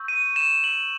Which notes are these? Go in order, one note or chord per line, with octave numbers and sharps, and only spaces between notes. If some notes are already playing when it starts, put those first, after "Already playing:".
Already playing: C#6 E6 G6
D#7
E7
F#7